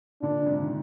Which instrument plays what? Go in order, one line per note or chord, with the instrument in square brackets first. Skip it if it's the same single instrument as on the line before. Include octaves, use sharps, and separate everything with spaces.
[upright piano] A#2 D3 [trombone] D4
[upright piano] G#2 C3
D#3